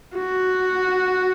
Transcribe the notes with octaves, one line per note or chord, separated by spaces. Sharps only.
F#4